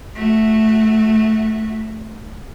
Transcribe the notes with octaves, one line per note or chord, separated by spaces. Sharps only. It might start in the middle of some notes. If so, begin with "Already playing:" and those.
A3 F#4